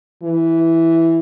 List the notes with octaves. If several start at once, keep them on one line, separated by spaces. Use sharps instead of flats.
E3